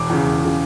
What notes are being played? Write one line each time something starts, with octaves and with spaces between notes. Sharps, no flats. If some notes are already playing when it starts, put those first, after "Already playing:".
Already playing: E1 D6
E2 C#3
E1
C#3